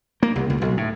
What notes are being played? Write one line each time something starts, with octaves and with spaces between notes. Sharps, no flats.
A#3
C2
C#2
B1
A2